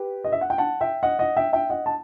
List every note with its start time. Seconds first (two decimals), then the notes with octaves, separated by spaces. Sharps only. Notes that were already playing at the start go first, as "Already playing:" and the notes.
Already playing: G4 B4
0.24 D#5
0.32 E5
0.41 F#5
0.50 G5
0.58 F#5 A5
0.81 E5 G5
1.03 D#5 F#5
1.19 D#5 F#5
1.37 E5 G5
1.53 E5 G5
1.70 D#5 F#5
1.86 A5